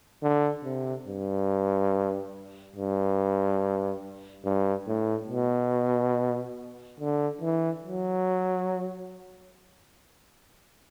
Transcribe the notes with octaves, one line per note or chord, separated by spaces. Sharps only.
D3
C3
G2
G2
G2
A2
B2
D3
E3
F#3